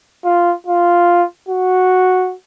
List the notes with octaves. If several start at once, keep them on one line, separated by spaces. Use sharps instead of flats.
F4
F4
F#4